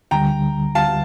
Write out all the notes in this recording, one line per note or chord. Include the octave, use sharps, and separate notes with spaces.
D2 D3 G3 G5 A#5
F5 A5